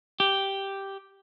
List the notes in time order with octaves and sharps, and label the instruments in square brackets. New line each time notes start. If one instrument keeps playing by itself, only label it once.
[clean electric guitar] G4